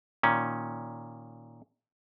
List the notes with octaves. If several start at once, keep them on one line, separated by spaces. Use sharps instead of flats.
A#2 D#3 C#4